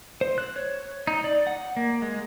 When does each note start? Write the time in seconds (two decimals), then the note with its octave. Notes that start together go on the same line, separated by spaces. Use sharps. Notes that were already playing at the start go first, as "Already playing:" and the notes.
0.21 C5
0.38 F#6
0.56 C#5
1.07 D#4
1.24 D5
1.47 F#5
1.76 A#3
2.02 G#3